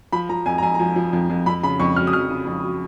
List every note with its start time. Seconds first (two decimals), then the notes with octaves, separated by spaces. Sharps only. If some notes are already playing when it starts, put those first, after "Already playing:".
0.12 F3 B5
0.29 F3 A#5
0.46 F2 G#5
0.58 A#5
0.63 F2 G#5
0.74 A#5
0.79 F3 G#5
0.96 F3
1.13 F2
1.30 F2
1.46 F2 B5
1.63 C#3 B5
1.80 F2 C#6
1.96 F#3 F6
2.07 D#6
2.13 F2 F6
2.30 C#3
2.47 F2
2.63 F#3